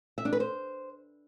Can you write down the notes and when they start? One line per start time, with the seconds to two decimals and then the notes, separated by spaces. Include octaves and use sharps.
0.18 E5
0.25 D4
0.33 B4
0.40 C5